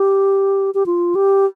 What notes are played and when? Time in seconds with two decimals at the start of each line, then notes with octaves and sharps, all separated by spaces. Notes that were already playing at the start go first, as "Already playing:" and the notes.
Already playing: G4
0.74 G4
0.86 F4
1.15 G4